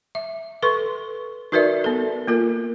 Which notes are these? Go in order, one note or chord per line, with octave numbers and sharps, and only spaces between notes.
E5
A4 B4 C6 C#6
D#4 F#4 A#4 B4 D5 E5
B3 A4
A#3 F4 A#4